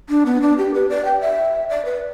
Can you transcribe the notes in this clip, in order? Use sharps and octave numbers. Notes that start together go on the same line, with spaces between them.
D4
B3
D4
G4
B4
D5
G5
E5
D5
B4